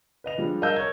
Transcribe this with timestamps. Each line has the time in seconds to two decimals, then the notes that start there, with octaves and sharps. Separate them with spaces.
0.24 B4 D#5 F7
0.38 F3 G3 G#3 D4
0.62 A#4 D#5 F5 A5 E6 G6
0.76 A#4 C#5 C#6 G#6